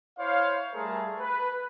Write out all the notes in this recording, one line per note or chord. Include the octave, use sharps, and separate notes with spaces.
E4 C5 C#5 F5
G3 A3 G#4 A#4 A5
B4